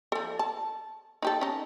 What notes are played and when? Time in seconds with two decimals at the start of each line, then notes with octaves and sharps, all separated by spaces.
0.12 F3 A4
0.39 A5
1.22 D#4 G4 A4
1.41 C#4 D#4